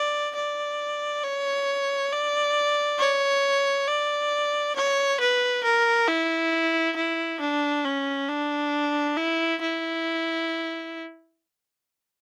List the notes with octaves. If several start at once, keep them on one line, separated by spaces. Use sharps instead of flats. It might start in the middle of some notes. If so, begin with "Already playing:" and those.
Already playing: D5
D5
C#5
D5
C#5
D5
C#5
B4
A#4
E4
E4
D4
C#4
D4
E4
E4